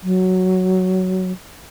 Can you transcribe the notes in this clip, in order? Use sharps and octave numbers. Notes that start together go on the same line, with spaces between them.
F#3